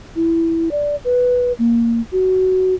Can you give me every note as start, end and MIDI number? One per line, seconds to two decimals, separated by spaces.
0.16 0.69 64
0.71 0.96 74
1.05 1.53 71
1.59 2.01 58
2.12 2.74 66